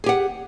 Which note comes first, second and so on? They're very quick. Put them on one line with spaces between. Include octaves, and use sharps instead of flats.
G#4 G4 F#5